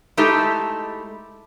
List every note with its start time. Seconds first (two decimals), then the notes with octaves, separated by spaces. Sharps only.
0.17 G#3 A3 D#4 E4 G4 A4